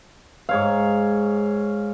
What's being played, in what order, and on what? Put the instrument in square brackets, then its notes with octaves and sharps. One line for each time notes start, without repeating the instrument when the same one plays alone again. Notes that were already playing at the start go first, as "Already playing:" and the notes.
[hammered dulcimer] G#2 C#5 F5